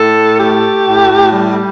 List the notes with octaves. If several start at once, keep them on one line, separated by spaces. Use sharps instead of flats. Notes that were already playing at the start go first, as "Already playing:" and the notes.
Already playing: A2 A4
A3 G4
A2
G3